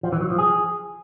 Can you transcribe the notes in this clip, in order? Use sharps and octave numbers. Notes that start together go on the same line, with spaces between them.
F3
E3
F#3
F3
G#4